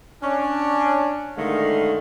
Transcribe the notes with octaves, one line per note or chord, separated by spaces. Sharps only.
C#4 D4
A2 D3 D#3 G#3 A3 F5